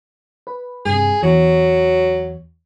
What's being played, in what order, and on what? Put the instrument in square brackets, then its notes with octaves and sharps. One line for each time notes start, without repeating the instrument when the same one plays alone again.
[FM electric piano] B4
[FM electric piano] G2 C3 [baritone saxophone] G#4
[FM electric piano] E2 [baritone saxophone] F#3